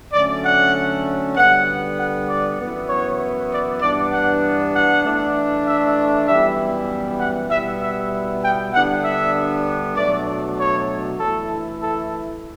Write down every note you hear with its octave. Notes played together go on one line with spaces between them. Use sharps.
D3 F#3 A3 C#4 D5
F#5
D3 G3 B3 F#5
F#5
D5
F#2 E3 B3 E4
C#5
D5
G2 E3 B3 D4 D5
F#5
F#5
E3 A3 D4
E5
F#2 E3 G3 B3 E4 E5
F#5
B2 G3 B3 E4 E5
E5
G5
D3 G3 B3 D4 F#5
E5
B2 F#3 A3 D4 D5
C#5
E3 A3 E4 A4
A4